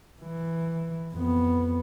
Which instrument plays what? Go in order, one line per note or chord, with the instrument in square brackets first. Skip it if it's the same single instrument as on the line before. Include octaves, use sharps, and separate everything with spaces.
[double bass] E3
F2 B3